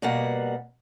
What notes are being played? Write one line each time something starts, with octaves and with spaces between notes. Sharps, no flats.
B2 G3 A#3 F#5